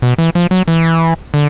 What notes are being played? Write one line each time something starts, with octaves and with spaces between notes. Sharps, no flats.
B2
E3
F3
F#3
E3
D3